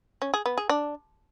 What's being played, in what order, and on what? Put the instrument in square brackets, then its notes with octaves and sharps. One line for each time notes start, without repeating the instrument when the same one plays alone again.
[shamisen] C#4
G#4
B3
G#4
D4